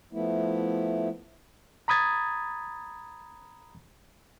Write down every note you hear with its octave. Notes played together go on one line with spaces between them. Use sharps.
F3 A3 B3 E4
A#5 B5 D#6 G#6 A6